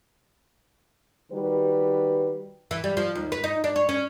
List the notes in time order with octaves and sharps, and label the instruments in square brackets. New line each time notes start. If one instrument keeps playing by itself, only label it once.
[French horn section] D#3 G3 F#4 B4
[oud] E3
G3
F3
D#2
B4
D#4
D4
C#5
C#4